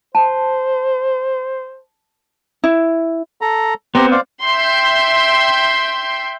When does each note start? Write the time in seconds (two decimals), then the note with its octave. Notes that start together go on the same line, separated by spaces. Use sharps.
0.15 C5 A5
2.64 E4
3.41 A4 A#5
3.95 B3 C4 G4 A#5 C6
4.11 C5 D5 F5
4.45 E5 G5 C6 G6 C7